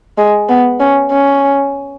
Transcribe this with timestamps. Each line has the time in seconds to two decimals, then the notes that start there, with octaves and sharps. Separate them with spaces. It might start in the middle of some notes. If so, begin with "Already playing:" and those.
0.18 G#3
0.49 B3
0.80 C#4
1.12 C#4